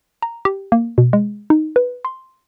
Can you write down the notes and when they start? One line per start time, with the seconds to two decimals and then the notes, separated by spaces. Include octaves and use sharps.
0.22 A#5
0.45 G4
0.72 A#3
0.98 B2
1.13 G#3
1.50 D#4
1.76 B4
2.05 C6